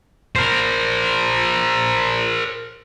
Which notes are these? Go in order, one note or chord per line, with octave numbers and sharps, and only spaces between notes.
A#4 C5